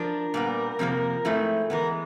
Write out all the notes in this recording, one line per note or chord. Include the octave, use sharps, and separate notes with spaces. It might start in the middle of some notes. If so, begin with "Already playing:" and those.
Already playing: F3 D4 A#4
A#2 G3 B3
F2 C3 F3 A#3
G#2 F3 A3 C4 E4
E3 G#3 B3 A#4